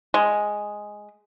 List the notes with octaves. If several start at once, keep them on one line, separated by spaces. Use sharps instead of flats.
G#3